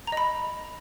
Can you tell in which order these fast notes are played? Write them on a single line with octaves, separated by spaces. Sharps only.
A#5 D#5 B5